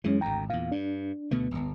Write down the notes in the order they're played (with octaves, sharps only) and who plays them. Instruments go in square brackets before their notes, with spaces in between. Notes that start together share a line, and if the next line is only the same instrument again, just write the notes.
[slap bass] F#2 E3 [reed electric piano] G#3 C#4
[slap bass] G#1 D2 [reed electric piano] G5 A#5
[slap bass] E2 A#2 [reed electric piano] F5
[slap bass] G2 [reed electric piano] D4
[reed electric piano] D2 B3 [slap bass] B2 D3 A3
[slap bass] D1 G1